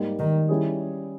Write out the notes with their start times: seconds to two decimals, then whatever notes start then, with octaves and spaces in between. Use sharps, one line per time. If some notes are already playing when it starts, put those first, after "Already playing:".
Already playing: G#2 G3 A#3
0.19 D#3
0.49 G3 C#4 E4 G#4